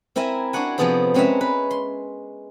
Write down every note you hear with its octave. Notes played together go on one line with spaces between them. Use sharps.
C4 E4 A#4 E5 G#5
D4 F#4 C#5 F#5 G#5
C3 F3 B3 G#4 A4 C5
G#3 C4 C#4 A#4 B4 E5
B4
C6